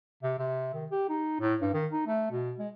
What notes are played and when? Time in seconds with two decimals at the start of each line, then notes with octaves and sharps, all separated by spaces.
0.23 C3
0.39 C3
0.74 D#3
0.91 G4
1.09 D#4
1.40 A2
1.61 G2
1.74 D#3
1.92 D#4
2.07 A3
2.31 B2
2.59 G#3